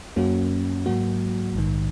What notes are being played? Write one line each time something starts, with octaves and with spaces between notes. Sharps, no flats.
F#2 F#3 A#3 C#4 F#4
G#2 F#3 A#3 F#4
A#1 G#2 D#3